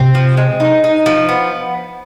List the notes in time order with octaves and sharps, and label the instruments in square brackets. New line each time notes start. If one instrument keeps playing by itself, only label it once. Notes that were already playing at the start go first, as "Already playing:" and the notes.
Already playing: [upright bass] C3 [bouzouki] C4
[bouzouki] F3
G#3
D#4
D#4
F3
B3